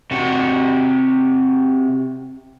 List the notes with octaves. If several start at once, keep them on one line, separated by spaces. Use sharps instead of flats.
C3 F#4